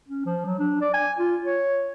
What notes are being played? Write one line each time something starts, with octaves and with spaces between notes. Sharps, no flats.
C#4
F3
F#3
D4
D5
G#5
F4
C#5